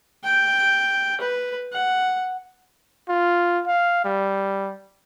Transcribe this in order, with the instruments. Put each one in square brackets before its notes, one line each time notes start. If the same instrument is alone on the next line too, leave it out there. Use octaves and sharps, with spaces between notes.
[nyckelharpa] G5
B4
F#5
[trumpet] F4
F5
G3